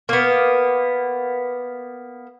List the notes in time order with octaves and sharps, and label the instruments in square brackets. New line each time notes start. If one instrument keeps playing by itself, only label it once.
[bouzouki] A#3 B3